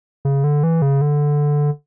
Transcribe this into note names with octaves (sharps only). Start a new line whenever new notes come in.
C#3
D3
E3
C#3
D3